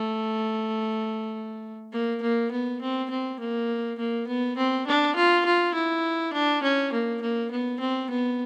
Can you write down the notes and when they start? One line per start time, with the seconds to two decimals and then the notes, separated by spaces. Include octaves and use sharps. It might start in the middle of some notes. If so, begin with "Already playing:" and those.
Already playing: A3
1.92 A#3
2.22 A#3
2.51 B3
2.81 C4
3.10 C4
3.39 A#3
3.98 A#3
4.27 B3
4.57 C4
4.87 D4
5.16 F4
5.45 F4
5.74 E4
6.33 D4
6.63 C#4
6.92 A#3
7.22 A#3
7.51 B3
7.80 C4
8.10 B3